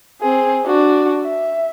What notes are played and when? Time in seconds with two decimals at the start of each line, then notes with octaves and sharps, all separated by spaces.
0.22 C4 G#4
0.66 D4 F#4
1.23 E5